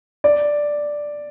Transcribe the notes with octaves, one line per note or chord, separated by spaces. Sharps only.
D5